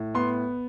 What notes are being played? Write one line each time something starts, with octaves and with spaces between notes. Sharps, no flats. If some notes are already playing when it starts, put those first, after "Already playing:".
Already playing: A2
B3 C6